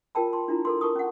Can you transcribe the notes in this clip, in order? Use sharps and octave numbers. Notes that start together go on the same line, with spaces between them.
F4 A#4 G5 A5 B5
C6
D4 E4 F4 A#5
A4 A#4 C6
A#4 A5 C#6 D#6
C#4 F#5